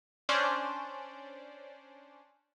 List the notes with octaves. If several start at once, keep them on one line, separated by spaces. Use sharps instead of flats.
C#4 D4 C5 D5